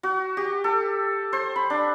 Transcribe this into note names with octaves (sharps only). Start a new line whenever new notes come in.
F#4
G4
A4
C5
B5
D4